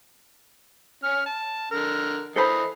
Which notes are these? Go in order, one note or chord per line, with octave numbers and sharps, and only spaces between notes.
C#4 F6
A5
D3 A#4
E3 A4 C5 D#5 B5 D#6